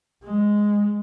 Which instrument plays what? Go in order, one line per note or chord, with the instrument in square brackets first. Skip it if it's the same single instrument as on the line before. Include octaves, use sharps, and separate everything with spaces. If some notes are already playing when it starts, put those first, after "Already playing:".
[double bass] G#3